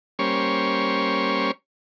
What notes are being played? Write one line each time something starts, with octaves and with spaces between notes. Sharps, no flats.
G3 A#3 C#4 C5 C#5